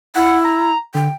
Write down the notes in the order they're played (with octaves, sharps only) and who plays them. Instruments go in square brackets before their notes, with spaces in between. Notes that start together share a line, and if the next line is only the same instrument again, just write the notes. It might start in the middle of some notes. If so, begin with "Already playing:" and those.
[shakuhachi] E4 [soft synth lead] F#5
[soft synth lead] A#5
[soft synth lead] D3 [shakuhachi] G5